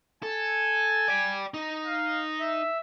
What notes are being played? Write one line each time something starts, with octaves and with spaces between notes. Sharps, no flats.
A4 G#5
D5 G5
D#4
F5
E5